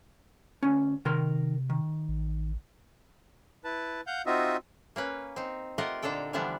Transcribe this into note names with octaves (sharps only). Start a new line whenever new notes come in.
D2 C#4
C3 D#3 A#4 C6
D#3
A1
E4 B4 A5
F5 F#5 G6
C4 D#4 F4 F#4 D#5 E5
A#3 C#4 B4
C4 D#4
A3 F4 G4 A#4 D#5 F#5
A#2 D3 D4 D#4 A4 G5
D3 E3 F3 G3 B3 D4